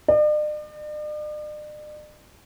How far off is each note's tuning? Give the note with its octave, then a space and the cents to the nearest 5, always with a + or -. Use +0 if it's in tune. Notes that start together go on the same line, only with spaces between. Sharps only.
D5 +45